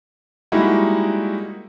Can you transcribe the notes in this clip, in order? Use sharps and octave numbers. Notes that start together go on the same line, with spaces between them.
G3 G#3 A#3 D#4 E4 F#4